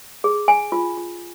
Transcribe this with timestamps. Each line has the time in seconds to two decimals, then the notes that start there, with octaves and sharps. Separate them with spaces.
0.24 G#4
0.48 G#5
0.72 F4
0.97 F4